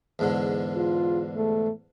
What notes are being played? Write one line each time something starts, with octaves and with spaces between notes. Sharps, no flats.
E2 G#2 D3
F4
A3